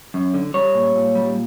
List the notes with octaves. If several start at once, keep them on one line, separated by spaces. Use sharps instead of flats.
F#2
D3
G3 C#5
A#2
A#2
G3